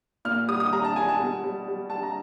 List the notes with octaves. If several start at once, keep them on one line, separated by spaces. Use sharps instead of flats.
A#2 F6
G3 D#6
D#6
G3 A#5
A5
G3 G#5
A5
B2
G3
G3
G3 A5
A#5